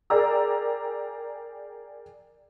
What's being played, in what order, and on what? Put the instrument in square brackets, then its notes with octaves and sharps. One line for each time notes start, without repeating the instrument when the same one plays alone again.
[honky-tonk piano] G#4 A#4 D5 G5 A#5 E6